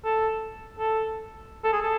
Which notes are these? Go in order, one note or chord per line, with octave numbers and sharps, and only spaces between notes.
A4
A4
A4
G#4
A4